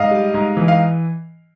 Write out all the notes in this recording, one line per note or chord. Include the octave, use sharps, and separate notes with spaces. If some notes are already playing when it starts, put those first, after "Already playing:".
Already playing: G#2 D#5 F5
G3
G#2
E3
F5